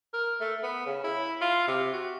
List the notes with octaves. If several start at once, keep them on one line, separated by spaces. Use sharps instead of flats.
A#4
A3
B3
C#3
E4
F4
C3
F#4